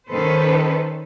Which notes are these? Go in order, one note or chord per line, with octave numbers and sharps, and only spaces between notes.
D#3 C#4 A4 B4 C5